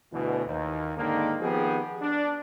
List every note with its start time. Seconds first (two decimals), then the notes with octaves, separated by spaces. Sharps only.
0.12 D2 B2 E3
0.46 D#2
0.97 G#2 D3 D#3 A#3
1.40 D#3 F3 B3 C4 G4 G#4
2.02 D4